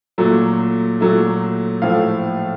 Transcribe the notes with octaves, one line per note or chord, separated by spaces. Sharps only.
A#2 F#3 A3
A#2 F#3 A3
A2 F3 A3 F5